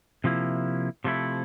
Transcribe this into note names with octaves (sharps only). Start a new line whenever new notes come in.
C3 F3 A#3 E4
C3 F3 A3 E4